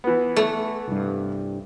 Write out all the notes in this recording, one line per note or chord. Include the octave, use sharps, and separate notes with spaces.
E3 B3
A3
C2 G2